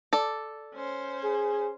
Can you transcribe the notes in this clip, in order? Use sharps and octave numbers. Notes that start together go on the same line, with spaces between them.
A4 D5
C#4 C5
G#4